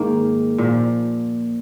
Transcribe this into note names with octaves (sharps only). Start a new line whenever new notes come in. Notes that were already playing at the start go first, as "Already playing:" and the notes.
Already playing: G#2 D#3 A#3
A#2 F3